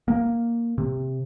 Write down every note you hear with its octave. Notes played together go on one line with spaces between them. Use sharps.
A#3
C3